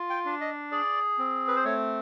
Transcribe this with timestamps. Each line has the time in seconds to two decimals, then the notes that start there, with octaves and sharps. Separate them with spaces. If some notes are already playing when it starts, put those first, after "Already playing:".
Already playing: F4
0.10 G5
0.25 D4
0.41 D#5
0.71 G#4 D5
1.18 C4
1.48 B4
1.56 C5
1.64 A3 C#5